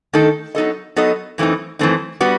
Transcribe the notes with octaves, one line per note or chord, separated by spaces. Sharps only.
D#3 A3 D#4 A4
F#3 B3 D#4 A4 D#5
F#3 B3 D#4 A4 D#5
F#2 E3 A3 C4 D#4
F#2 E3 A3 C4 D#4
G3 B3 F#4